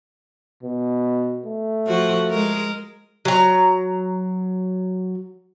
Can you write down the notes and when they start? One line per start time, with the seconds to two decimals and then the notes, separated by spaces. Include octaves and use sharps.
0.63 B2
1.46 A3
1.87 F3 F#4
2.30 G#3 A#4
3.25 F#3 A#5